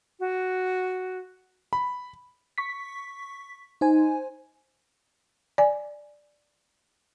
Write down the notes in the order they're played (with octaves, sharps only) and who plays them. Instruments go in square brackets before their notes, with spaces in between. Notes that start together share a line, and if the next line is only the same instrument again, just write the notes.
[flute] F#4
[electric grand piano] B5
[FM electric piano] C#6 B6
D#4 C5 G#5
[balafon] D5 G#5